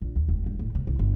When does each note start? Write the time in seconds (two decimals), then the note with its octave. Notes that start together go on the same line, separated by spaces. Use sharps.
0.02 A#1
0.16 D#2
0.29 F1
0.46 G2
0.59 A2
0.75 C3
0.87 C2
0.99 G1